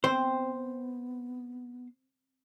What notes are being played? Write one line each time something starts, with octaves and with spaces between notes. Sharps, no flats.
B3 C4 C5